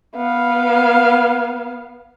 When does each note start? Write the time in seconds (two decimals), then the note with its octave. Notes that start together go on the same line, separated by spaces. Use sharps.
0.16 B3 F5